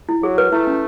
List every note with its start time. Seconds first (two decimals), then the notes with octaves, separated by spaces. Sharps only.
0.09 E4
0.23 F#3 G#4
0.38 B4
0.52 A3 E4
0.67 C#4